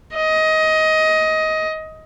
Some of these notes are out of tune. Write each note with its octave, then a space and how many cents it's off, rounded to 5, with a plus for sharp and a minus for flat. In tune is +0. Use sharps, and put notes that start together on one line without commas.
D#5 +20